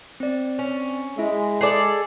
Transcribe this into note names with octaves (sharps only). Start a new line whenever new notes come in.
C4 D5
C#4
G#3 E4 E5
G#4 A4 D5